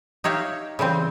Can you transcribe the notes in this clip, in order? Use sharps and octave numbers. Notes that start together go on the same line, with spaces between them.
D#4 G4 C#5 E5 F5
C#3 E3 G3 C4